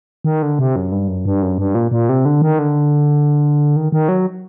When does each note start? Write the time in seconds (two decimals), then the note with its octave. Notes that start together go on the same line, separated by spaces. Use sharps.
0.24 D#3
0.42 D3
0.59 C3
0.76 F#2
0.92 G2
1.08 F#2
1.25 G2
1.42 F#2
1.58 G2
1.75 A#2
1.91 A#2
2.09 C3
2.25 D3
2.42 D#3
2.59 D3
3.76 D#3
3.92 D#3
4.08 F#3